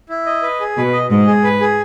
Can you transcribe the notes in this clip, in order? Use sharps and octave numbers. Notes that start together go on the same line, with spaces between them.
E4
D#5
B4
G#4
B2 B4
D#5
G#2 D#5
G#4
B4
G#4